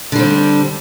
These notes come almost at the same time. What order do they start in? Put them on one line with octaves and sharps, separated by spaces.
D3 G3 C4